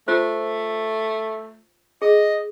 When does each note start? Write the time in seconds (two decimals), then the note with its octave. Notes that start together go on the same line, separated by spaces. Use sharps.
0.08 A3 F4 C5
2.02 G#4 D#5